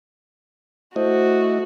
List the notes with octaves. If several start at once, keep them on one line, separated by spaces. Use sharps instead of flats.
A3 E4 F#4 C5 D#5